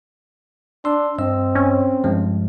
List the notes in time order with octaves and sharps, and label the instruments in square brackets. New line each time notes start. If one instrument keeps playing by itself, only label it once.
[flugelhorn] D4 [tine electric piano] C6 E6
[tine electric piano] G2 D#5 E6 [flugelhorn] C4
[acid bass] C#4
[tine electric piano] G2 F3 G#3